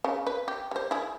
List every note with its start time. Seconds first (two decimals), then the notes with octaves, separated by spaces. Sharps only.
0.04 C#3
0.27 B4
0.48 G4
0.71 G3 C5
0.91 E4 G#4